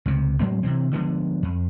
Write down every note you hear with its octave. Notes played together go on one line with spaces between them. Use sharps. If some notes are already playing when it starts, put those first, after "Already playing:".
C#2 C3
A2 F#3 G#3 C4
C3 E3 C4
D3 F3 G#3 B3
F2